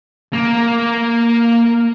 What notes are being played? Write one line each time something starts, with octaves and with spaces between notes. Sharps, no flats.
A#3